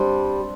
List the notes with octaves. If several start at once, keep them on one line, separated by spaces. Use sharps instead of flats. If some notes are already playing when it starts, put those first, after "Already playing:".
Already playing: G3 C4 D4